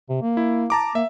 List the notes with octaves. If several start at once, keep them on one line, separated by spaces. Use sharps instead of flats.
C3
A#3
E4
A5 A#5 D6
A#3 E5